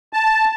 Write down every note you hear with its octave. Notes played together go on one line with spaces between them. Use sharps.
A5